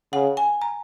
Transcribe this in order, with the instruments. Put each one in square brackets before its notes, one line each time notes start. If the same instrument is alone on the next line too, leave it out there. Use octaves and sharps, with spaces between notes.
[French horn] C#3 [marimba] F#5
[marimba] G#5
A#5